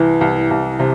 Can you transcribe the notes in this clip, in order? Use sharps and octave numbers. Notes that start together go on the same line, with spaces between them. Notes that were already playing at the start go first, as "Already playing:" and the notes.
Already playing: C2 E3
C2
C2
C3